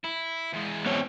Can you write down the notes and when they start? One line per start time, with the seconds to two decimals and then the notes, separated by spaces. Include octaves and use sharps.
0.04 E4
0.54 E2 G#3
0.86 B3 C4 C#5